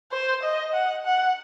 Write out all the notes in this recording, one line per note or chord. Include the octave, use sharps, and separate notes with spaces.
C5
D#5
F#5
F#5